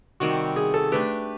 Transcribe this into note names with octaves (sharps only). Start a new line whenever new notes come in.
C3 D#3 G3 C4 F#4
G#4
A4
A3 D4 G4 B4